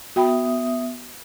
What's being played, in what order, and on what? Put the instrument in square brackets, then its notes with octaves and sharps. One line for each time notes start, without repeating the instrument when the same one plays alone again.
[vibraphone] B3 E5 D#6 [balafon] F#4 G5 B5